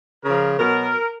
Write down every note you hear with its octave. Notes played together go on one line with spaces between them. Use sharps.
C#3 F3 A#4
B2 F#3 A#4